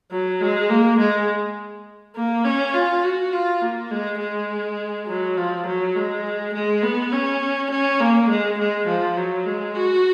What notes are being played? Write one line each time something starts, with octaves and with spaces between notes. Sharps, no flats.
F#3
G#3
A#3
G#3
A#3
C#4
F4
F#4
F4
A#3
G#3
G#3
F#3
F3
F#3
G#3
G#3
B3
C#4
C#4
A#3
G#3
G#3
F3
F#3
G#3
F#4